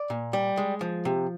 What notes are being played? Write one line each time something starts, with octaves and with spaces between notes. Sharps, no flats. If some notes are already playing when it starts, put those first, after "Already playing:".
Already playing: D5
A#2
G3
G#3
F3
C3